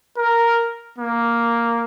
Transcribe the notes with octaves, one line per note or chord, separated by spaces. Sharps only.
A#4
A#3